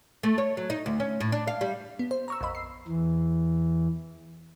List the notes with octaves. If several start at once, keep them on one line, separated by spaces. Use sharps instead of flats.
A3
C#5
F#3
D#4
D2
C#4
A2
D4
F5
G3
B3
C5
A#5 C#6 E6
A#1 F2 D#5 B5
C7
E2 E3